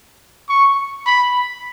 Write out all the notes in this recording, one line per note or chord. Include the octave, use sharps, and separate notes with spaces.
C#6
B5